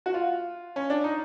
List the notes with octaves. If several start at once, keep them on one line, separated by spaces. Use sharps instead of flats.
F#4
F4
C#4
D4
D#4